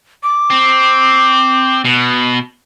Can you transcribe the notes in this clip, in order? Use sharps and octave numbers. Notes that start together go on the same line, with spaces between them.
D6
C4
B2